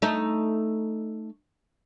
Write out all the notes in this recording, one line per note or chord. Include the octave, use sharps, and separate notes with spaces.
A3 D#4